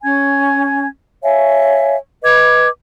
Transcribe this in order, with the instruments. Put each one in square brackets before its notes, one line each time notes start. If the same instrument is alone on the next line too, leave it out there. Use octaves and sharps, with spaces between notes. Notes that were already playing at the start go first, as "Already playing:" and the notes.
[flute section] C#4 G#5 G#6
C#5 E5 F5 G#5
B4 D#5 D6 G#6